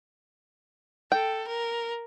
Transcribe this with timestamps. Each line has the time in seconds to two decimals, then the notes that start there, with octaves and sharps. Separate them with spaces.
1.12 A4 G5
1.47 A#4